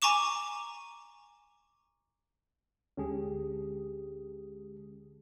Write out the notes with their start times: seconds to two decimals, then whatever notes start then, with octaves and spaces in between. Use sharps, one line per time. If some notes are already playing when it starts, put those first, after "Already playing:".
0.02 G#5 A#5 C#6 D6 E7
2.97 D2 D3 G#3 C#4 G4 G#4